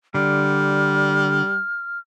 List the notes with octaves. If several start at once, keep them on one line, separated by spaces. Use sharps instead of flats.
D3 G3 F6